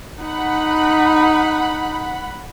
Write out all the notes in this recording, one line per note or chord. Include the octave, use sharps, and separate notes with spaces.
D#4 F#5 B5